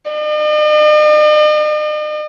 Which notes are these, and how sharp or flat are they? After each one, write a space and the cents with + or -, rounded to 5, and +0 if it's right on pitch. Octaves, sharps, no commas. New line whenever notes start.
D#5 -45